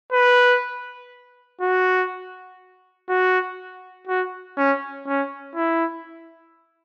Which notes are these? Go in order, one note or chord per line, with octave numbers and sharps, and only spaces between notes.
B4
F#4
F#4
F#4
C#4
C#4
E4